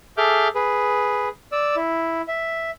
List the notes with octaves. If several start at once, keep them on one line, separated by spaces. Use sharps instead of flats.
G#4 A4 E5 D6 F6 G6
G#4 B4
D5 E6
E4
E5